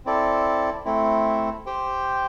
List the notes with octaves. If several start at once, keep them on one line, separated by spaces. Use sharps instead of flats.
C4 E4 A4 D5
A3 C4 E4
G4 C5 G5